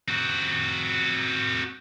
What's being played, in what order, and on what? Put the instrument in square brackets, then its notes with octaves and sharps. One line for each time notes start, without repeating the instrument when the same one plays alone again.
[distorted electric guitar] C4 F#4